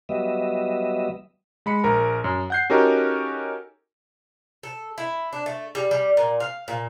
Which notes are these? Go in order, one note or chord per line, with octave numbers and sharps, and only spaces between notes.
F#3 G3 B3 D#5 E5
G#3 B5 C#7
A#1 A#4 A#5
F#2
F#5 G6 C7
C#4 D#4 F#4 G4 A4 A#4
A4
E4
D4
A3
G3
G3
A#2
F5
A#2